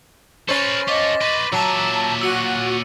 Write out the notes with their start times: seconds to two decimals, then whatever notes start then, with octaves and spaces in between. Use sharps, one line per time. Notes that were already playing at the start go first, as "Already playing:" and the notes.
0.49 C#4 A4 B4 C5 C#6 A6 A#6
0.88 F4 A4 D#5 D6 B6
1.21 B4 C5 A6 D#7
1.52 A#2 F#3 E5 A5 A#5 E6
2.21 F#4 E6 C#7 D#7